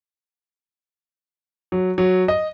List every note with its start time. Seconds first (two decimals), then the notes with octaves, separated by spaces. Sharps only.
1.72 F#3
1.98 F#3
2.28 D#5